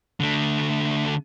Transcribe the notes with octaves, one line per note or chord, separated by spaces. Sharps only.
D3 A3